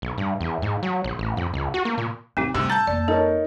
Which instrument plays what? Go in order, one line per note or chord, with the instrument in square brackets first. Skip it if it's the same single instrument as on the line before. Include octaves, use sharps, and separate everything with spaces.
[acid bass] B1
G2
E2
G#2
F#3
A#1
A1
F2
C#2
F#4
A#3
A#2
[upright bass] F#2 A#2 [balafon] C4 D#4 G4
[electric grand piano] D2 C3 [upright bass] G2 [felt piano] E6
[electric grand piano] A5 G6 A6 [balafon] A#5
[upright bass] F2 A#3 [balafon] D5
[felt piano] D#4 A#4 C#5 [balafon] A4